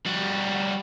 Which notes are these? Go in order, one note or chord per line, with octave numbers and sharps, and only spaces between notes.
G3 F#4